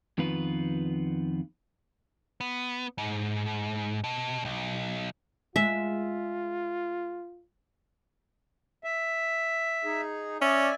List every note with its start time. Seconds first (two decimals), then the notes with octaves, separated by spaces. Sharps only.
0.18 F2 D#3 B3 F4 B4
2.41 B3
2.98 G#2
4.04 B2
4.45 B1
5.56 G#3 F4 E5
8.84 E5
9.84 D#4 G#4
10.41 C#4 D5 E5 G#5